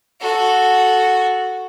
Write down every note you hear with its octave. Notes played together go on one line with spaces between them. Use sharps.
F#4 A4